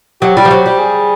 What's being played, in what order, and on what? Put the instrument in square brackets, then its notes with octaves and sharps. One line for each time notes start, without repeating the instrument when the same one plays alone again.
[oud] F#3 [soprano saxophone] G4
[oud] G3
F3
F#3
G3
[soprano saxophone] G#4